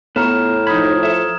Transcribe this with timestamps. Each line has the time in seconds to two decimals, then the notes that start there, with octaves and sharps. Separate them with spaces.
0.16 A2 B3 F4 C#5 A#5 F6 E7
0.67 F3 D#4 B5 D#6 G#6
1.03 A4 E5 E7